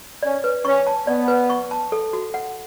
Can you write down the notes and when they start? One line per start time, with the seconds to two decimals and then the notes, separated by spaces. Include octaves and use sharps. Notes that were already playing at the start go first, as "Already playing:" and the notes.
0.23 C#4 D5
0.44 B4
0.65 C#4 C#6
0.87 A5
1.07 B3 D5
1.28 B4
1.50 C#6
1.71 A5
1.92 A4
2.13 F#4
2.34 F#5